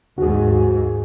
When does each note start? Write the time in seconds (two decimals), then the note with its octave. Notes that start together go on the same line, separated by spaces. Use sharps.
0.18 D#2 G#2 F#4 G#4